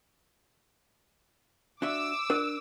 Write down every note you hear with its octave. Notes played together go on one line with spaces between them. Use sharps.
D4 F#4 E5 D6 E6
D4 A#4